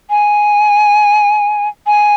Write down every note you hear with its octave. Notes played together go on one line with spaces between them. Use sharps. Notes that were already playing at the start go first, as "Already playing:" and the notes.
G#5
G#5